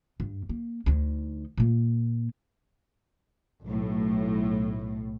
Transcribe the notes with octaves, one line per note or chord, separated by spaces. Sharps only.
G2
A#3
D2 D#4
A#2 A#3
B1 A2